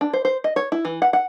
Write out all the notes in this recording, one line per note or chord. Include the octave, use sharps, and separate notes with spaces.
D4
C5
C5
D#5
C#5
E4
E3
F#5
F#5